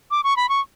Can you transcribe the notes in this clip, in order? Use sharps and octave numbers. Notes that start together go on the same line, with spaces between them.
D6
C#6
B5
C#6